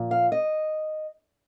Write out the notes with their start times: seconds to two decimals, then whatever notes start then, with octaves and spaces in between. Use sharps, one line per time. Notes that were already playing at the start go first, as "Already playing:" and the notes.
Already playing: A#2 F3
0.11 F5
0.32 D#5